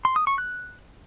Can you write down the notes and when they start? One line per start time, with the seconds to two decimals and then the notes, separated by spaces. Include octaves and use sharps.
0.05 C6
0.16 D#6
0.27 C#6
0.38 F#6